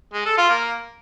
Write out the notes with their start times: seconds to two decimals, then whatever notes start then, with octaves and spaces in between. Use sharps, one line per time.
0.14 G#3
0.26 A4
0.37 F4
0.49 A#3